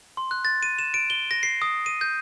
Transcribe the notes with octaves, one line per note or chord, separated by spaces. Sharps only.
C6
F#6
A6
D#7
E7
D7
G7
A#6
C7
D#6
D#7
G6